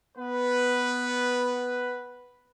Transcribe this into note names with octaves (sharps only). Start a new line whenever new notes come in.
B3 B4